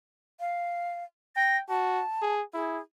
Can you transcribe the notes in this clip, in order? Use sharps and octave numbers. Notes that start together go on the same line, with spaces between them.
F5
G5 A#6
F#4 A5
G#4
E4 G#4